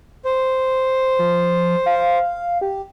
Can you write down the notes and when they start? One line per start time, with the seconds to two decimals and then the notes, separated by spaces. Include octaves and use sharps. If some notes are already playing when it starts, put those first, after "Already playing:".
0.25 C5
1.19 F3
1.86 F5
2.61 G4